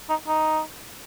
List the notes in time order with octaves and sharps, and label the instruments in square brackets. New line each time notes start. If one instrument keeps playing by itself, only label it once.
[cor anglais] D#4
D#4